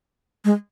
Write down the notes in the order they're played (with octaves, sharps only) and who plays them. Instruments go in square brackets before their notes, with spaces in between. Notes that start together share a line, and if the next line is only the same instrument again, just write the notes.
[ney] G#3